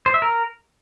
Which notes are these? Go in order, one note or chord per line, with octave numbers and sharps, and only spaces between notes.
C5
E5
A#4